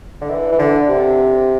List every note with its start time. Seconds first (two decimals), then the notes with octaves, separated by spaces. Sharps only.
0.22 D3
0.29 E3
0.52 E3
0.59 D3
0.89 C3